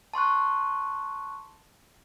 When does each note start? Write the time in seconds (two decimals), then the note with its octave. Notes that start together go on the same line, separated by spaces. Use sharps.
0.14 A5 C6 C#6 F#6